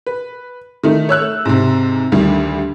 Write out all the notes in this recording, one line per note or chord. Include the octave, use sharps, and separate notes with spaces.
B4
D#3 A3 D#4
C#5 E6 F#6
A3
G#2 C3
D2 D3 D#3 G3